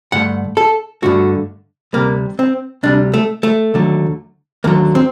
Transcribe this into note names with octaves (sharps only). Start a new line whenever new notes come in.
G2 D3 A3 F#5
A4
G2 D3 A3 F#4
D2 C3 G3 A#3
C4
D2 C3 G3 D4
A3
A3
D#2 D3 F#3 A3
D#2 D3 F#3 A3 A#3
C4